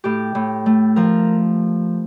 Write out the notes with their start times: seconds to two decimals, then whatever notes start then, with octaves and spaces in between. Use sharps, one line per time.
0.04 A2 G4
0.35 A2
0.66 A3
0.96 F3 A#4